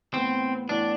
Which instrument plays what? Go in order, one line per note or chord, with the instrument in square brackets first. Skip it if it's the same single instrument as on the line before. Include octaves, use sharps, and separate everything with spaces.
[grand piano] A2 E3 B3 [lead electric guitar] C4
[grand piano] A2 E3 B3 [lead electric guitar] D4